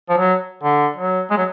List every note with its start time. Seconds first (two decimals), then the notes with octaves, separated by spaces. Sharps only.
0.09 F3
0.18 F#3
0.63 D3
0.96 F#3
1.30 G#3
1.37 F#3